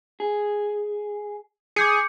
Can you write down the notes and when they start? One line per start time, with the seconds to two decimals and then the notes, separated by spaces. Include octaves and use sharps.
0.20 G#4
1.76 G#4 D6 G6 C#7